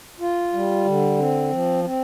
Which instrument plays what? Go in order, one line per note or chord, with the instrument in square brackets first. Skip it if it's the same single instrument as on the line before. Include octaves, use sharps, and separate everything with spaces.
[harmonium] F4
G3
D3
C4
F3
C4